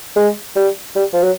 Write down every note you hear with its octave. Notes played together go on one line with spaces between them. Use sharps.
G#3
G3
G3
F3
F#3